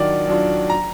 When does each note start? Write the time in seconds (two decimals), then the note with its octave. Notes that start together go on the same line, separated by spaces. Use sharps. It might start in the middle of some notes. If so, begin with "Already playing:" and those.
Already playing: D#3 F#3 D4 F4 D5
0.27 F#3 D4 F4
0.70 A#5